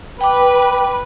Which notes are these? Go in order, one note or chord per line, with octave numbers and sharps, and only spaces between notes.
B4 G5 D6